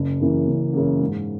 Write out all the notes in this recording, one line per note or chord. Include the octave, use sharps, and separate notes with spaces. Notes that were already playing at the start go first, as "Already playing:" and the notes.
Already playing: F#1
F#2 C#3 E3 A#3
F#1
F#2 C#3 E3 A#3
G#2